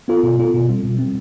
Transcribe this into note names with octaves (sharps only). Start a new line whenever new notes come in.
B3 F4 A4
B2
B3 F4 A4
B2
G3 C4
B2
G3 C4